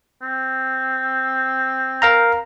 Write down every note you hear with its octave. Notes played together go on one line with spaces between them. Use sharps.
C4
A#4 F5 A#5